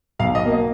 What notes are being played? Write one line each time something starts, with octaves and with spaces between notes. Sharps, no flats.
B1 F5
D#5
B2 A#3
D#5